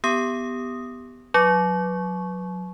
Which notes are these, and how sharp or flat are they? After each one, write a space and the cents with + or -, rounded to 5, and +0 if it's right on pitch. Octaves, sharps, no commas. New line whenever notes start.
B3 +5 G4 +5 D#6 +0
F#3 -20 C#6 -5